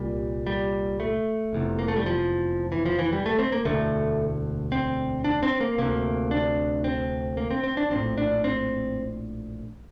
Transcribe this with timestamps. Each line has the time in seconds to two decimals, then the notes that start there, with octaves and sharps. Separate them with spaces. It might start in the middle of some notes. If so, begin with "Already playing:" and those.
Already playing: C2 A#2 G3
0.47 G3
1.00 A3
1.53 F1 E2 C3
1.79 A#3
1.88 A3
1.96 G3
2.06 F3
2.72 E3
2.86 F3
2.99 E3
3.13 G3
3.26 A3
3.39 C4
3.52 A#3
3.65 E1 D2 D3 A3
4.72 C4
5.24 D4
5.43 C4
5.61 A#3
5.78 D2 C3 A#3
6.31 D4
6.84 C4
7.37 A#3
7.51 C4
7.64 C4
7.77 D4
7.90 A#1 A2 C4
8.18 D4
8.44 C4